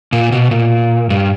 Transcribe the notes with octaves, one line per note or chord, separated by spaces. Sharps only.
A#2
B2
A#2
G2